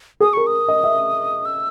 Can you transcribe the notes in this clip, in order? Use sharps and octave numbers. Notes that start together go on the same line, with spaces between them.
G#4 D#6
A#4 C#6
D#6
D#5
E5
E6